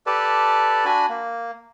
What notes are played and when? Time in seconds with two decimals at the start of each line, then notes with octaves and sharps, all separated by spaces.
0.06 G4 A4 B4 D5 A5
0.85 D4 F#4 G#5 B5
1.09 A#3